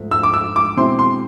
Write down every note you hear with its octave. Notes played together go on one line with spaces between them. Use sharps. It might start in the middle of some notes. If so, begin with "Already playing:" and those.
Already playing: G#2 F3 A3
E6
D6
E6
D6
B2 G#3 C4 E4 C6
C6